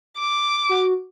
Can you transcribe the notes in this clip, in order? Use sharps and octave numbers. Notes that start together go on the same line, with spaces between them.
D6
F#4